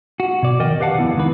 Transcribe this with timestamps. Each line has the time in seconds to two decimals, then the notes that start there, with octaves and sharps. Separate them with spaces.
0.20 F#4
0.43 B2 D5
0.59 F2 D#3 A#4 D5 D#5 G5
0.80 G4 B4 F5 F#5 A5
0.99 F2 C3 B3 E4
1.15 C#2 D#3 B4